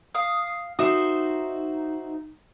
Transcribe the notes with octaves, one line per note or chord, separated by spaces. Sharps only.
F5 D#6
D#4 F#4 C5 E5 D#6